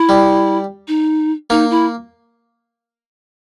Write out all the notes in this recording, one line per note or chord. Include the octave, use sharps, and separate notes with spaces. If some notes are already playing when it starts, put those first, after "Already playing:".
Already playing: E4
G3
D#4
A#3 D#4
E4